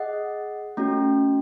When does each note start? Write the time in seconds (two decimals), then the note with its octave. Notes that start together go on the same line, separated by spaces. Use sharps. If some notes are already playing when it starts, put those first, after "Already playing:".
Already playing: G#4 D#5 F#5
0.77 A3 C#4 F#4